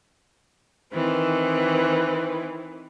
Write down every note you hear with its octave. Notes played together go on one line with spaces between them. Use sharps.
D#3 E3 C4